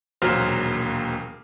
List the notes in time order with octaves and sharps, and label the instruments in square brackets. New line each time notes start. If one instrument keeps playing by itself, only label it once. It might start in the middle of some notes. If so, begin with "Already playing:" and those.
[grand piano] E1 D#2 A#2 F#3 C5 F6